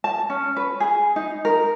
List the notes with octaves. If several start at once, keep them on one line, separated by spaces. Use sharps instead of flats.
A5
C#4
B4
G#4
D#4
A#4